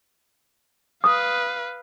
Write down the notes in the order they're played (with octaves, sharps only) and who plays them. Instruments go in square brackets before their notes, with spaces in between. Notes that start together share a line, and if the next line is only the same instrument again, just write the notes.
[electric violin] B4 F5 [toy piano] D#6